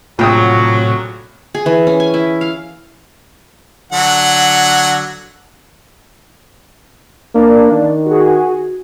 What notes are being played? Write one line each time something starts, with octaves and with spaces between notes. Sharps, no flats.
A#1 A2 C3 F#3 F4 G5 D#6
G#4
E3
C#4
G#5
E4
F5
D3 F#3 F#5
A#3 D4
D#3
F#4 G#4